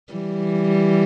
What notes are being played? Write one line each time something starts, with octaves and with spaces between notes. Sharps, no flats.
E3 G3